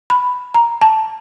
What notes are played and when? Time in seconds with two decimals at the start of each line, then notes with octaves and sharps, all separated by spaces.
0.10 B5
0.54 A#5
0.81 A5